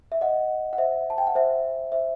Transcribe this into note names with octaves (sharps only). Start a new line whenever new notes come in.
E5
D#5 F#5
F#5
C5 E5
A5
G5
F#5
C5 E5
C5 E5